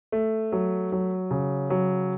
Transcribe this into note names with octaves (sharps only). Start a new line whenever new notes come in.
A3
F#3
F#3
C#3
F#3